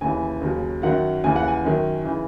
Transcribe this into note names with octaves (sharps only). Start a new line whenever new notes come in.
D#2 C#3 E3 G#5
D#2 C#3 F#3
F#2 D#3 F#3 F#5
D#2 C#3 E3 G#5
F#5
G#5
F#2 D#3 F#3
C#3 E3